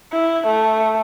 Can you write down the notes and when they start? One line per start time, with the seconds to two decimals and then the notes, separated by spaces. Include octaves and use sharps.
0.13 E4
0.47 A3